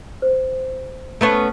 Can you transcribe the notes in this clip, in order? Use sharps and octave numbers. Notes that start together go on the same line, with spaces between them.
C5
A3 B3 C#4